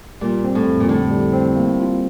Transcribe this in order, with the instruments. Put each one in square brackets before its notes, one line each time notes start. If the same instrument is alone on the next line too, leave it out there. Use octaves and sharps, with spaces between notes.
[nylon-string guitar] A#2 [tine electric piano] G3
[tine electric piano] C4
[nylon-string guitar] A2
[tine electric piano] F2
[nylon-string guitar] A#2
[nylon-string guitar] A2 [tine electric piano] D3
[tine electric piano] G3
C4
A#3
F4